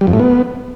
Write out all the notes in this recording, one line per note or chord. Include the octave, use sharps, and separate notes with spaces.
G3
F2
A2
B3